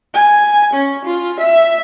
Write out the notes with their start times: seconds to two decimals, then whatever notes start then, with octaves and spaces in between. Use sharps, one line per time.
0.14 G#5
0.73 C#4
1.05 F4
1.40 E5